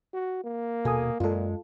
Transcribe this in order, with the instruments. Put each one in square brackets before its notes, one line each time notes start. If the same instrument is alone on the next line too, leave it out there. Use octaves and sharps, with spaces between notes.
[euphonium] F#4
A#3
[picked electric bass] D#1 B2 [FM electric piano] A4 G#5 D#6
[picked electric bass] F#2 G#3 [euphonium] A#2 [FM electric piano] F4 A4